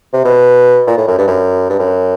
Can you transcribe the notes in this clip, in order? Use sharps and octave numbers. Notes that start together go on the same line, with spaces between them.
C3
B2
A#2
A2
F#2
G2
F#2
G2
F#2